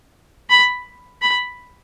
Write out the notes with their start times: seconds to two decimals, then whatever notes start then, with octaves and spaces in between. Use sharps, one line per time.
0.50 B5
1.22 B5